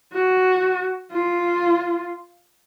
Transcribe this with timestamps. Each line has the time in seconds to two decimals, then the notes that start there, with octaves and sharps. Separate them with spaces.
0.13 F#4
1.12 F4